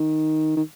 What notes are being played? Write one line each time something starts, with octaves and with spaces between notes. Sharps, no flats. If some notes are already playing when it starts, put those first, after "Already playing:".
Already playing: D#3
D#3